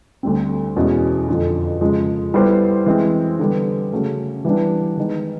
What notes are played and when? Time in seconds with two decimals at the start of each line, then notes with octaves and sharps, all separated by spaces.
0.23 D2 D3 G3 C4
0.76 E2 B2 G#3 C#4 E4
1.28 F2 D3 F3
1.81 C#3 F3 G#3
2.34 G3 B3 E4 A4 C5
2.86 E3 G#3 C4
3.39 D3 G3 B3
3.92 C#3 F#3 A3 C#4
4.45 E3 G3 B3 D4
4.97 D#3 G#3 B3 D#4